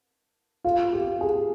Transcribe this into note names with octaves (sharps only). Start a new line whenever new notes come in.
F4
G4
G#4